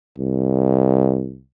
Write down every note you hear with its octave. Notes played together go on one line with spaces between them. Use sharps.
C2